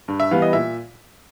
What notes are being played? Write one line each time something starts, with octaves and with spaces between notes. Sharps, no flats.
G2
E5
E3 G3 B3 F5
D#5
A#2 E5